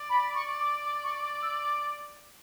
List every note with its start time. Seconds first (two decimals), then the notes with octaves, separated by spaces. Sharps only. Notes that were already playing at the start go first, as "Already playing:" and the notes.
Already playing: D5
0.10 B5
0.35 C#6
0.60 D6
0.85 D6
1.04 C#6
1.23 D6
1.42 E6
1.61 D6